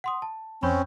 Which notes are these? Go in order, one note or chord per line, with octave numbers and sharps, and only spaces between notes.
F#5 C6 D#6
A5
F2 C4 C#4 B5 C#6 G6